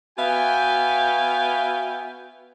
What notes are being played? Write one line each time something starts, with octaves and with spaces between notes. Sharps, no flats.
B3 F#4 E5 F5 G5 G#5